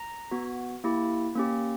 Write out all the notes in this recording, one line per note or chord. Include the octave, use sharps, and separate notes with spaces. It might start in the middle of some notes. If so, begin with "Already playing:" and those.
Already playing: A#5
B3 F#4
A#3 E4 G4
A#3 C#4 G4